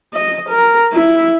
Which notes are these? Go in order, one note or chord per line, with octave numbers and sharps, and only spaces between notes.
D#5
A#4
E4